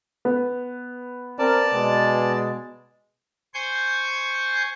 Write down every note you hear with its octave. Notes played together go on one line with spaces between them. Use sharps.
B3
C4 A#4 D5 A5
B2 G#3
C5 G#5 C#6 G6